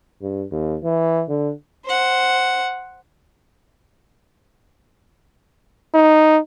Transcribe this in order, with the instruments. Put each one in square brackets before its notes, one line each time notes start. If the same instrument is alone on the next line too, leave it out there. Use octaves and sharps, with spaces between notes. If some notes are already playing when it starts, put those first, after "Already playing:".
[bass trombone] G2
D#2
E3
D3
[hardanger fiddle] C5 F#5
[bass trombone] D#4